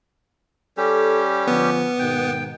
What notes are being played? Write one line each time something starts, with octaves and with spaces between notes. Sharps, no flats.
G3 C#4 G4 A4
D3 F3 B3
G#2 B2 D#3 G5